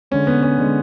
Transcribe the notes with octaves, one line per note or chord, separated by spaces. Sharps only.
D3 G#3 C#4
B3
C#4
D3 G#3